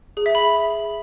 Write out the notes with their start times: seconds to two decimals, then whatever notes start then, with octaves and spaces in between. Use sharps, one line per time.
0.17 G#4
0.26 E5
0.35 B5